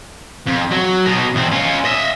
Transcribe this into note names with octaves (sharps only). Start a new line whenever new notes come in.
F2
F#3
B2 D#4
E2 C4
C#4 F4
D#5 E5